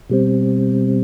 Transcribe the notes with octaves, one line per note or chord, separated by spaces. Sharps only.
B2 G3 C4